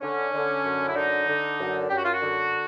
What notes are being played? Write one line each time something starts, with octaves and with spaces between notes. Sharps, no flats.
D3 C#4
D3
F#2
E4
D3 D#4
D3
F#2
F#2 G4
F#4
F4
F#4
D3